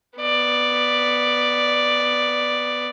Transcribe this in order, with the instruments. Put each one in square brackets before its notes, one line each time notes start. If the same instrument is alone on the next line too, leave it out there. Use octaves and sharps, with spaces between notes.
[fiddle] B3 D5